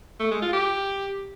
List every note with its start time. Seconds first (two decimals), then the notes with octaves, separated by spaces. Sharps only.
0.20 A3
0.31 G#3
0.42 F4
0.53 G4